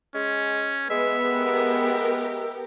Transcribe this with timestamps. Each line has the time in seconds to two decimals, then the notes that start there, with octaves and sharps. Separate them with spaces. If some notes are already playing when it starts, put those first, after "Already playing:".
0.15 G#3 C#4
0.90 G#3 B3 E5
1.24 G#3 G4 A#4